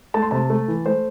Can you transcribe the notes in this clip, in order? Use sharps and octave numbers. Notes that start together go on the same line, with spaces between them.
A3 A5
C6
C3 A5
A3
E3
A3 C5